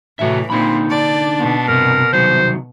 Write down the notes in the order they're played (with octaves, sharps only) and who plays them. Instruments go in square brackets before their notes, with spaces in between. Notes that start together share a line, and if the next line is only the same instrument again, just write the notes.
[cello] A2 E3 [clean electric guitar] C3 F#4 E5
[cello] A#2 C4 [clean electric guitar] D3 D#4 B5
[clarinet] D4 [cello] D5
[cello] B2
[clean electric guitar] G2 C3 [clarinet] A#4
[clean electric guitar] C2 D#3 F#3 [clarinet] C5